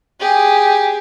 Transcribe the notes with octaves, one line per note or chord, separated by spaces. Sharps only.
G4 G#4